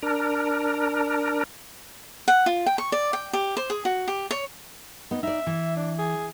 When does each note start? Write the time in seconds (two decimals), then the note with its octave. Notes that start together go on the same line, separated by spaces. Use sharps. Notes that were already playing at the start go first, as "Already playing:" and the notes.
0.02 D4 A#4
2.28 F#5
2.46 F4
2.66 G5
2.78 C#6
2.92 D5
3.13 G5
3.33 G4
3.57 C5
3.70 G#4
3.85 F#4
4.08 G4
4.31 C#5
5.11 B3 D#4
5.23 D#4 D5 E5
5.47 E3
5.76 D4
5.99 G#4